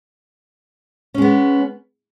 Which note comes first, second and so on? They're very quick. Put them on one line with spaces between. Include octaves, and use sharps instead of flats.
C#4 G#3 B3